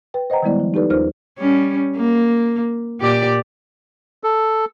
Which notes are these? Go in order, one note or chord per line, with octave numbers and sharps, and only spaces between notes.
B4 G5
C5 D#5 F#5 G5 A#5
D#3 G3 G#3 B3 E4 D5
F3
D#4 G4 A4 B4 D5
D#2 D#4 F4 A#4 C5 F6
G3 C#4
A#3
A#2 G4 D5
A4